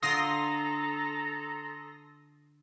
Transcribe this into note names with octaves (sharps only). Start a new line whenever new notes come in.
D3 F4 A4 A#4 A#5 C6 D#6 A#6